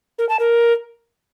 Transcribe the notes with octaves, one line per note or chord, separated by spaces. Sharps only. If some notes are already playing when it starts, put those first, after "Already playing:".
A#4
A5
A#4